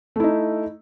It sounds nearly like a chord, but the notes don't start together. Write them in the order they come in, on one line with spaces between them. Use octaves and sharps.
A3 E4 D#4